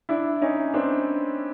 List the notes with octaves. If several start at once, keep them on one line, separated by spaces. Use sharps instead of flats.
D4 E4
C#4 D#4
C4 D4